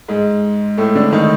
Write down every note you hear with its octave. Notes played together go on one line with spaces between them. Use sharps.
G#2 G#3
A2 A3
D3 D4
D#3 D#4